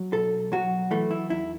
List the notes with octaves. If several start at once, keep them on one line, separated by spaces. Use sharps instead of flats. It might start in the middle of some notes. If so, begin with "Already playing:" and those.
Already playing: F#3
B1 A4
F#3 F#4
E3 A3
E4
E2 E4